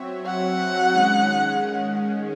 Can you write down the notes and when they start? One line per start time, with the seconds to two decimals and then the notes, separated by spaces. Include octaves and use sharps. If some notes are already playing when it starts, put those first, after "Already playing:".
Already playing: F#3 C4 F#4 C#5 E5
0.26 F#5
0.94 D#3 G#3 C#4